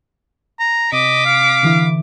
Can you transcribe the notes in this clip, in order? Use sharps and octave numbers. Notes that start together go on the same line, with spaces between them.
A#5
C3 D#5 D6 B6
F5
D3 E3 E4